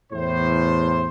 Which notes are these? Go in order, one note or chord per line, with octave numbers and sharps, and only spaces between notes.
E2 A2 C5